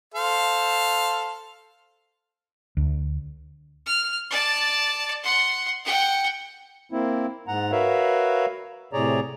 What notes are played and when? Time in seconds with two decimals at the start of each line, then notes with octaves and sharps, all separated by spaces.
0.14 A4 C5 F5
2.77 D2
3.87 F6
4.31 D5 A5
5.23 F#5 C6
5.85 F#5 G5
6.92 A#3 C4 E4
7.48 G#2 F#5 A#5
7.72 F#4 A#4 B4 C#5 E5 F5
8.93 A2 C3 G#4 C#5 D5 A#5